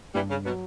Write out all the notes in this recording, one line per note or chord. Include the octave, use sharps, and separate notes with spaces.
G2 E3 G3
C#3
B2 F#3